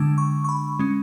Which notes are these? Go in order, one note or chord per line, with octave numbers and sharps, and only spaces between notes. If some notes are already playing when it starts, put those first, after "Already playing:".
Already playing: D3 G#3 D4 E6
C#6
C#6
B5
G#3 C#4